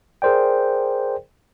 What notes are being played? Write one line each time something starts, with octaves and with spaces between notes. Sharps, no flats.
G#4 A#4 C5 D5 G5